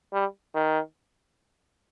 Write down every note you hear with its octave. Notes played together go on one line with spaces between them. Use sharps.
G3
D#3